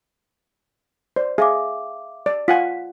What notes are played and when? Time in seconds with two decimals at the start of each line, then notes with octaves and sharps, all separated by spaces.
1.16 C5 D5
1.38 G#4 E5 F5 D6
2.26 D5
2.48 F4 F#5 G#5 B6